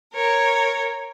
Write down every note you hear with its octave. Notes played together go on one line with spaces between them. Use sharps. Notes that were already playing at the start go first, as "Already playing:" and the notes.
A#4 C#5